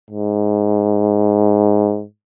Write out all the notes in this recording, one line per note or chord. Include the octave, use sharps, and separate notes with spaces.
G#2